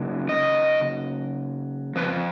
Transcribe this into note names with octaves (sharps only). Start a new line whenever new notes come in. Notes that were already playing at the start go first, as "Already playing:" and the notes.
Already playing: C#3 F#3 A#3 D#4
D#5
F2 F3 B4